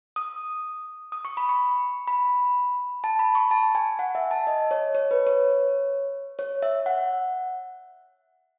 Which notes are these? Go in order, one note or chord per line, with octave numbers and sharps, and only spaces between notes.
D#6
D#6
C#6
B5
C#6
B5
A5
B5
C#6
A5
G#5
F#5
E5
A5
D#5
C#5
C#5
B4
C#5
C#5
E5
F#5